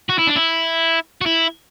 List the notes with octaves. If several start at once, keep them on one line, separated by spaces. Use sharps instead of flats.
F#4
E4
D4
E4
F#4
E4